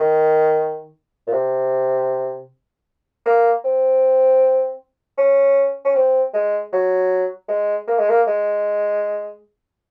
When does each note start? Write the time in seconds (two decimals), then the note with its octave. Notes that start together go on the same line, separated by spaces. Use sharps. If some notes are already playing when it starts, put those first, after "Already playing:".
Already playing: D#3
1.27 A#2
1.33 C3
3.25 A#3
3.64 C4
5.18 C#4
5.85 C#4
5.95 C4
6.34 G#3
6.72 F#3
7.49 G#3
7.87 A#3
7.98 G#3
8.09 A#3
8.27 G#3